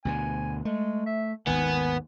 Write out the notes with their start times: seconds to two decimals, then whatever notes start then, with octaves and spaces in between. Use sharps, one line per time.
0.05 D2 B2 D3 G#5
0.65 G#3 A3
1.06 E5
1.47 G#1 D#2 D#3 B3 G#5